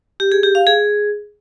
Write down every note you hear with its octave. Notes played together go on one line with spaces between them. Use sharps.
G4
G#4
G4
F5
G#4